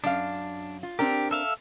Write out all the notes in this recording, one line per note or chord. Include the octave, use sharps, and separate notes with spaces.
F#2 D4 F5
F4
C4 D4 G4 A#4
A4 E5 F5